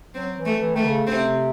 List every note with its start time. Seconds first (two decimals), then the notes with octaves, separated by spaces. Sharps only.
0.14 F#3 C4
0.37 E3
0.45 A3
0.61 E3
0.75 D#3 A3
0.84 C#3
1.07 C3 C4